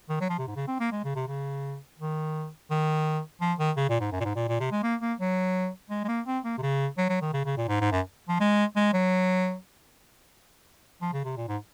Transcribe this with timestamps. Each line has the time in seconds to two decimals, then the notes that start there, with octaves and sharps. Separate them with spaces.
0.09 D#3
0.20 F#3
0.29 F3
0.39 C3
0.47 G#2
0.56 C#3
0.68 C4
0.80 A#3
0.92 G#3
1.04 C#3
1.15 C3
1.27 C#3
1.99 D#3
2.70 D#3
3.41 F3
3.59 D#3
3.76 C#3
3.89 A#2
4.00 G#2
4.12 F#2
4.20 A#2
4.24 G#2
4.36 A#2
4.48 A#2
4.60 C3
4.71 G#3
4.83 A#3
5.01 A#3
5.19 F#3
5.90 G#3
6.04 G#3
6.08 A#3
6.26 C4
6.44 A#3
6.58 C3
6.62 C#3
6.98 F#3
7.09 F#3
7.21 D#3
7.33 C#3
7.45 C#3
7.57 A#2
7.68 G#2
7.81 G#2
7.92 F#2
8.28 F3
8.40 G#3
8.76 G#3
8.93 F#3
11.02 F3
11.13 C#3
11.25 C3
11.37 A#2
11.48 G#2